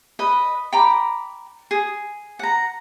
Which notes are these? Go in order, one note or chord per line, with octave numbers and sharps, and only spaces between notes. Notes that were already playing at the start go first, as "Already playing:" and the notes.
B4 D#5
G5 A#5 B5 D6
G#4
F#5 A#5